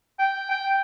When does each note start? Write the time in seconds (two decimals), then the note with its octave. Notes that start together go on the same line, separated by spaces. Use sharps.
0.19 G5
0.50 G5